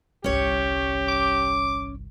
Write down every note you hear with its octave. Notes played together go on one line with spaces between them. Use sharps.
G1 C2 C#4 G4 C#5
D6